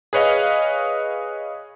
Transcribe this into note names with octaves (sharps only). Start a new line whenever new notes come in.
G#4 B4 C#5 D#5 F5